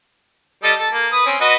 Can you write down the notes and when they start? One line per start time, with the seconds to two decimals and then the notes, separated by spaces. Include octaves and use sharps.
0.63 G3 A4 D#5
0.79 A4
0.92 A#3
1.12 B4 D#6
1.26 C4 C#4
1.41 F#4 B4 D#5